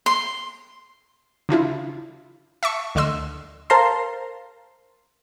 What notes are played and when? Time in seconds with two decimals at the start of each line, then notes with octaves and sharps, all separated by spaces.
0.06 C6
1.49 C#3 D4 E4 F4
2.63 E5 A5 C#6
2.95 D2 D3 D#5 C6 E6
3.70 A#4 C5 F5 A5 A#5 C6